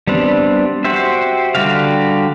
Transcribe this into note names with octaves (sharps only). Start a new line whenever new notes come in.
G3 B3 C4 D4
F#4 G4 C5 E5
D3 G3 F#4 G4 F5